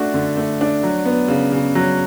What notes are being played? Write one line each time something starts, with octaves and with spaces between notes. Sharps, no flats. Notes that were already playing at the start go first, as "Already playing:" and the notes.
Already playing: A3 D4 F#4
D3
A3
D4
F#3
B3
C#3
C#3
F#3